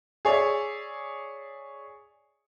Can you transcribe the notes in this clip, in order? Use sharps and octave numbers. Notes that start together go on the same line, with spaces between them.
G#4 C#5 D5 E5